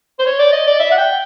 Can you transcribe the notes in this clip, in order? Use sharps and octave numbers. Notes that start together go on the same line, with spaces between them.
C5
C#5
D5
D#5
D5
E5
F#5
G5